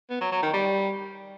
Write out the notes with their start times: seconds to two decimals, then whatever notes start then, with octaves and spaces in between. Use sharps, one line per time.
0.10 B3
0.21 F#3
0.32 F#3
0.42 D#3
0.53 G3